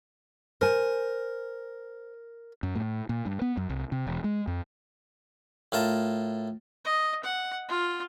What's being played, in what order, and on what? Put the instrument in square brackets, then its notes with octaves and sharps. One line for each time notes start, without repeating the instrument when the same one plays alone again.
[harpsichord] A#4 [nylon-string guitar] C5 G#5
[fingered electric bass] F#2
A2
A#2
G2
B3
F#2
C2
C3
E1
G#3
F2
[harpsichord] A2 F4 A#4 A5
[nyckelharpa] D#5
F#5
F4